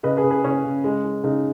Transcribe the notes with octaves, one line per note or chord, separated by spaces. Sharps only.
C#3 B4 D#5
G#4 B4
C#3
G#4 B4
C#3 C#4
C#3
G#3
G#3
C#3 D#4